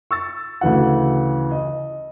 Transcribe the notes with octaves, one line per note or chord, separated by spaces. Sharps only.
C#6 E6 A6
D2 C#3 E3 F#4 F#5
D#5